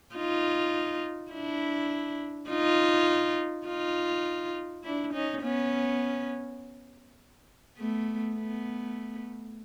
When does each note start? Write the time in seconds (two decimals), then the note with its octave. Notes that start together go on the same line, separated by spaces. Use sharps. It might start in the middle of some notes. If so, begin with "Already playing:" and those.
0.15 D#4 F4
1.32 D4 E4
2.50 D#4 F4
3.67 D#4 F4
4.84 D4 E4
5.14 C#4 D#4
5.43 B3 C#4
7.78 A3 B3
8.36 A3 B3